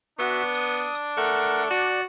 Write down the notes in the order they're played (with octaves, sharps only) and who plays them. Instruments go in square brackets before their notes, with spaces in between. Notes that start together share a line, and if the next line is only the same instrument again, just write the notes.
[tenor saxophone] B3 [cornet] D4 [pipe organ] F#4 E5
[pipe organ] D#6
[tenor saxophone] A3 [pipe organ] A#4 F#5
[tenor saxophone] F#4 [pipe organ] D5